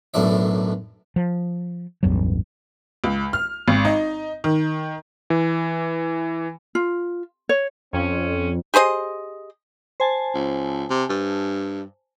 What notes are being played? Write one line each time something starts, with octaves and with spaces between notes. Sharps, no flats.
B1 F#2 A2 B3 D4 E5
F3
A1 E2 G2 F#3
C#2
F6
G#1
D#4
D#3
E3
F4
C#5
F2 C4 C#4
G4 G#4 C5 D#5
C5 G#5 A5
C#2
C3
G2